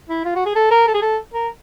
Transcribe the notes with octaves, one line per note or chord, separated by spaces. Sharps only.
E4
F4
F#4
G#4
A4
A#4
A4
G#4
A4
A#4